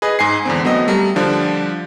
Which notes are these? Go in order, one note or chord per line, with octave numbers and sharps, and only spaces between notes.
G#4 B4 D#5
G#2 G#5 C7
E2 D3 C4
F#3 A3 B3 C4 D#5
G3 A3 A#4
D3 F3 G3 D4